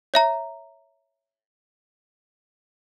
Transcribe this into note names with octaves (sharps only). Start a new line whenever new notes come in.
C#5 E5 A#5